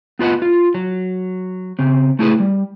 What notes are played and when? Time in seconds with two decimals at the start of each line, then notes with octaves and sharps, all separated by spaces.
0.19 B3 F4 B4 D#5 F#5
0.42 F4
0.74 F#3
1.79 C#3 C4
2.19 A3 E4 G#4 B4
2.40 G3